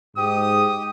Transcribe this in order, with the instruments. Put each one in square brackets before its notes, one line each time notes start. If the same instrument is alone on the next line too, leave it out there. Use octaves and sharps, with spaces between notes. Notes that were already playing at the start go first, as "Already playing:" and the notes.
[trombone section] G#2 [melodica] G4 [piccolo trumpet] D#6